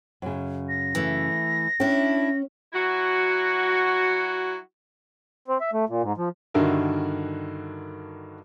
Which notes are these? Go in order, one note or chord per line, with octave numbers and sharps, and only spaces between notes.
F#2 C#3
A#6
E3 A3
C#4 D4 E4 G5
F#3 E4 F#4
C4
E5
A3
A#2
G#2
F3
G2 D3 D#3 F#4 A#4 E5